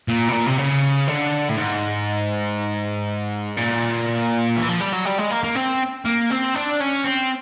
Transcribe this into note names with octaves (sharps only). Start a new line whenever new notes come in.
A#2
B2
A#2
C3
C#3
D3
A2
G#2
A#2
E3
F3
G3
F#3
G3
G#3
A#3
A#3
C4
A#3
C4
D4
C#4
C4